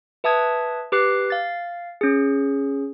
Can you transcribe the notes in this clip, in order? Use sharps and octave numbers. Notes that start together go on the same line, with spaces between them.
B4 E5 A5 D#6 G#6
G4 B4 D6 F#6 C7
F5 A6
C#4 G#4